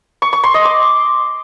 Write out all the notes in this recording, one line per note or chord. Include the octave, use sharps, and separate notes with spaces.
C#6
C#6
C6
D#5
D6